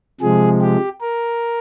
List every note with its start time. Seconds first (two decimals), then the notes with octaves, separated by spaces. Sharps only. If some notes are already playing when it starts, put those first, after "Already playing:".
0.21 C3 F3 G#3 G#4
0.61 G4
1.01 A#4